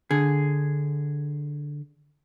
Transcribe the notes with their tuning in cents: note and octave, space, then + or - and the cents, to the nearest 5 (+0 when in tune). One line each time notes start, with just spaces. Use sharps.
D3 +0 G#4 +0